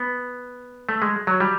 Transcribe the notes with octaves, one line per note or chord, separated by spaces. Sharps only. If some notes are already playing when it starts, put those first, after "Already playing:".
Already playing: B3
A3
G#3
F#3
G3